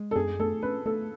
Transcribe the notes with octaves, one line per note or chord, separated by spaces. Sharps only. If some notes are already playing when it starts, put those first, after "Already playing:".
Already playing: G#3
A4
F#2 G#4
A3 A4
C#4 B4
A3 A4